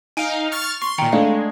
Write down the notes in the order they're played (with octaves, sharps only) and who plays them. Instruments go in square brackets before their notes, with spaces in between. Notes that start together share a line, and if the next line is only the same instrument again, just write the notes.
[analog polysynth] D#4 F5 [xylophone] G#5 D7
[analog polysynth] C#6 F6 A6
[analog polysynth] C6 [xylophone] C#6
[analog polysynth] A#2 D#3 [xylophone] G5 A#5 C#7
[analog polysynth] G#3 [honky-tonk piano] A3 D4 [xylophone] F5